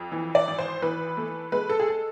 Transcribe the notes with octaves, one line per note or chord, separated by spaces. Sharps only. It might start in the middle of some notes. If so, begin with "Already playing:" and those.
Already playing: F2
E3
D5
G#1
C5
E3 B4
A3
G#3 B4
A4
G#4
A4